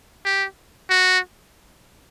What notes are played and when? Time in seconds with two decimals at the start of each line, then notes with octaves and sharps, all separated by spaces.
0.25 G4
0.90 F#4